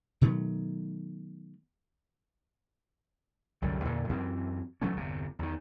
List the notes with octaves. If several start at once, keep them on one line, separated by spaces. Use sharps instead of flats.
B2 D#3 F#3 A3
C2 F#2 D3 G3
E2 A#2 D3
F#2 E3 C4
E3 F#3 A3 C#4
G1 E2 C3
E2 D#3